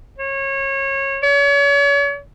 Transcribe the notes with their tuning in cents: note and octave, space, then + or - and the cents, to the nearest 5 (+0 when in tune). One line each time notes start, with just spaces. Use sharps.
C#5 -25
C#5 +40